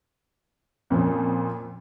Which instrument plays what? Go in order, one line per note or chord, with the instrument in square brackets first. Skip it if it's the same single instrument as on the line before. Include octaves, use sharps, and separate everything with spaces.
[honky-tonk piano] F2 A#2 F3 C#4